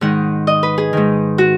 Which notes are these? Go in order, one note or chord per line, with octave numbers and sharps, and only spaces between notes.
G#2 D#3 F#5
D#5
B4
G#4
G#2 D#3
F#4